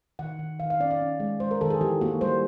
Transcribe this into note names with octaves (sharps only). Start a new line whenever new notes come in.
D#3 F#5
D#3
D#3 F5
F5
C#4 D5
D5
C#4
G#3
G#3 C5
A#4
D#3 A4
G#4
E3 G4
A#3 F#4
G3 C5